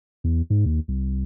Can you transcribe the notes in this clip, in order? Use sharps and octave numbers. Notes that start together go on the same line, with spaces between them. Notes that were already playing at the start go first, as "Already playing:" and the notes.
E2
G#2
D#2
C2